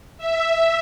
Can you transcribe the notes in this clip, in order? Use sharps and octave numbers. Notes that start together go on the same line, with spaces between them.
E5